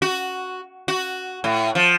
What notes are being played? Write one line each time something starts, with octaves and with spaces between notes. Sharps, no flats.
F#4
F#4
A2
F3